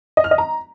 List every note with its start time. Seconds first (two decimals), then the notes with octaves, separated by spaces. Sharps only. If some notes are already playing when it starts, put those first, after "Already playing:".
0.17 D#5
0.24 F6
0.31 D#5
0.38 A#5